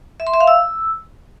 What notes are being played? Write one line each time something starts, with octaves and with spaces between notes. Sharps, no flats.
E5
C6
E5
F5
E6